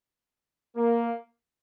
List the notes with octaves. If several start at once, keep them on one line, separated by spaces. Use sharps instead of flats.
A#3